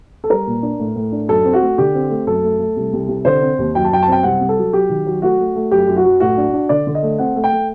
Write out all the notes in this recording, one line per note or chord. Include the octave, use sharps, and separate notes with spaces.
A4
G3 A#4
A#2
D4
A2
A2
D4
F#2 A4
C4
F#4
A3
D3 G4
C4
A3
F#2 A4
A3
A3
C2
C2
C3
D3 C5
C4
D#2
F#2 G5
A5
F#2 G5
A5
C4 G5
C2 F#5
C2
A4
F#3
F#3 G4
D#3
F#3
A3 F#4
A3
A3
F#2 G4
F#2
F#4
F#3
A2 F#4
D4
D4
D3 D5
D3
D#5
A3
C4 F#5
A3
G5
A3